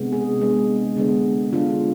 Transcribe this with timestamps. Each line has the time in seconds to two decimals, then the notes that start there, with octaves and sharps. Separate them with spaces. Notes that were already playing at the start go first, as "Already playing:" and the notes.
Already playing: C3 G#3 B3 D4
0.12 G#4
0.41 C3 G#3 B3 D4
0.96 D3 G#3 B3 D4
1.53 D3 G#3 B3 D4 F4